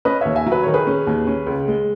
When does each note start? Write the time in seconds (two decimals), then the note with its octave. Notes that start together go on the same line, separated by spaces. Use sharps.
0.05 C#4 B4 D#5
0.21 D#2 C#5 E5
0.36 E5 G#5
0.46 F#3
0.52 B4
0.63 D#3 C#5
0.74 G#4 B4
0.87 C#4
1.07 D#2
1.27 C#4
1.47 C#2
1.68 G#3